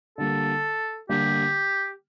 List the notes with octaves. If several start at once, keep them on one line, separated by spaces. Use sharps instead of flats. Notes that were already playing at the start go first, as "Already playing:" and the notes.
D3 G3 A#3 A4
D3 G3 A#3 G4